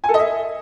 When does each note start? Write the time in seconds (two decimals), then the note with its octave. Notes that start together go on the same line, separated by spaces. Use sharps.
0.04 G#5
0.09 A4
0.14 D#5
0.19 E5